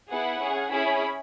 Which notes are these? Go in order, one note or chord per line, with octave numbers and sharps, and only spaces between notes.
B3 E4 G#4 F#5
C#4 G#4
C#4 E4 G#4 B5